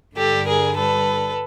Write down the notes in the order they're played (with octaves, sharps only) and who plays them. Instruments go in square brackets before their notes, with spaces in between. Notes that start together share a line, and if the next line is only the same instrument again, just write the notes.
[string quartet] G2 D3 G3 G4 A4
G#4 A#4
A4 B4